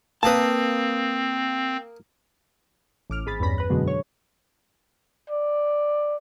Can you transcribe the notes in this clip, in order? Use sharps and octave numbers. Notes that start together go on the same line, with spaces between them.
A#3 C4 B4 A5 D#6
A1 D6 F6
G#1 G#4 B5 A6
E2 G2 C#4 B5 A#6
B4 F#6
F#2 B2 D3 F#3 G#3
C#5
D5